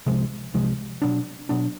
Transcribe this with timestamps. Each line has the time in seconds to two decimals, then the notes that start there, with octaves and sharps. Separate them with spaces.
0.06 C2 C3 F3 G#3
0.54 C2 C3 F3 G#3
1.02 B2 F#3 B3 D4
1.49 B2 F#3 B3 D4